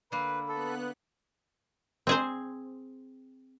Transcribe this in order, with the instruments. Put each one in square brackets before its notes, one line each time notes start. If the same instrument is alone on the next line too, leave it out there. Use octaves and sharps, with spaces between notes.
[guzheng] D3 A#3 [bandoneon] B4 [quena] B5
[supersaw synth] B3 F#6 [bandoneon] A4
[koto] C4 G#4 C5